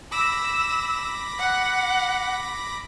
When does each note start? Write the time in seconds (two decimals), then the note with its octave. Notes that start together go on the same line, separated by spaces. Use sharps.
0.12 B5 D6 E6 A#6
1.39 F#5